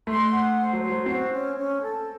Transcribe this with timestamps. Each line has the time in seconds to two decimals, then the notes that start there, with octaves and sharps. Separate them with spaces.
0.07 A3 C6
0.32 F#5
0.57 C5
0.73 F#3
0.81 C5
0.90 F#3
1.06 C4 F#4
1.32 C#4
1.56 C#4
1.81 A4